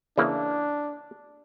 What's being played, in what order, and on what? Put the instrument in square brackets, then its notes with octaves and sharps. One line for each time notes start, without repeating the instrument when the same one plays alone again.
[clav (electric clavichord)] C#3 E3 A#3 [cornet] D4